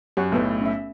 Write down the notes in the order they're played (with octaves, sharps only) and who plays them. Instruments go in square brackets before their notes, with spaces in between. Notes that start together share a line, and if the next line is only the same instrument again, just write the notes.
[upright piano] F#2 [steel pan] G4 C#5 F#5
[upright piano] B1 A2 [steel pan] A3 B3 B4
[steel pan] C#4 E5